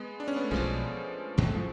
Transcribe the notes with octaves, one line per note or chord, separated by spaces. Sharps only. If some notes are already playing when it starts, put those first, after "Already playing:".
Already playing: G#3 B3
D4
C#4
B3
A3
B1 B2 F3 F#3 G#3
A1 G#2 F#3 G#3
A3
F3 G#3